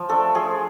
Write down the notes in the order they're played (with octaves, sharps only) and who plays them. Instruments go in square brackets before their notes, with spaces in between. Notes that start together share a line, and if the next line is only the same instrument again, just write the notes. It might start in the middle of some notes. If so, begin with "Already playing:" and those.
Already playing: [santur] F3
A3 D4 A4
F3 G#4